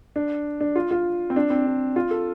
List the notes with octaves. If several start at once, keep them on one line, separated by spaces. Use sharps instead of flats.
D4
D4
F4
F4
C4
D4
C4
D4
F4
A4